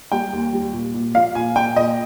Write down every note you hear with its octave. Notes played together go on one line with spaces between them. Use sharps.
G3 G5
D#2
G3
A#2
A#2
F3 F5
A#2 G#5
A#2 G5
A#2 D#5